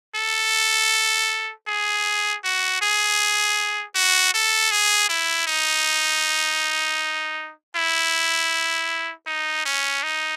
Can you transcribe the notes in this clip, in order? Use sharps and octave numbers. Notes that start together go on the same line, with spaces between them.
A4
G#4
F#4
G#4
F#4
A4
G#4
E4
D#4
E4
D#4
C#4
D#4